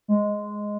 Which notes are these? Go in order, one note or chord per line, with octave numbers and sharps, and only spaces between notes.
G#3